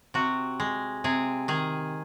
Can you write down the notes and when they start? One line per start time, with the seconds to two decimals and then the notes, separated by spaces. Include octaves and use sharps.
0.14 C3 F#4
0.60 G#3
1.04 C3 G#4
1.48 D#3 G#4